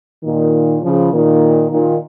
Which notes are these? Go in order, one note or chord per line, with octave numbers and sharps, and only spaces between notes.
A#2 D#3
C#3 F3
A#2 D#3
A#2 D#3